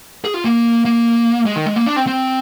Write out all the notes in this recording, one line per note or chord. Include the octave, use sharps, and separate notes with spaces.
G#4
F4
A#3
A#3
G#3
D#3
G#3
A#3
D4
C4
C4